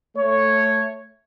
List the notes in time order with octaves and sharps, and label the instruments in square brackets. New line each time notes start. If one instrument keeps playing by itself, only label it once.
[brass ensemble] A3 C#5